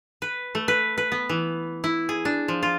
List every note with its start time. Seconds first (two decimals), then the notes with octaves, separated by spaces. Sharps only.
0.22 B4
0.55 A3
0.68 B4
0.98 B4
1.12 B3
1.29 E3
1.84 E4
2.09 G#4
2.25 D4
2.48 F3
2.63 F4